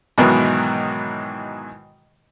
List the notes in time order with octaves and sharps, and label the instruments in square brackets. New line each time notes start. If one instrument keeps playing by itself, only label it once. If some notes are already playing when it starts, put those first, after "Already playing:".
[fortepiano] G#2 B2 D#3 E3 F#3